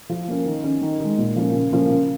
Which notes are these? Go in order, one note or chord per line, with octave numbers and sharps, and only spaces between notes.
F3
A#3 C#4
D#3
C#4
D#3
G#3 D#4
A#2
F3 A#3 C#4
C#3
F3 A#3 C#4
C#3